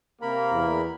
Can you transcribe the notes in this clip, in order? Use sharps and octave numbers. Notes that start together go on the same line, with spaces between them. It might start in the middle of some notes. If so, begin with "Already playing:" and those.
C3 A#3 A#4 B5
E2